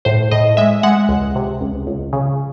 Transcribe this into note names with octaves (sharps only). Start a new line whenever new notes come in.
A2 C5
A2 D#5
G#3 E5
G#3 F#5
C#2
C3
C#2
C#2
C#3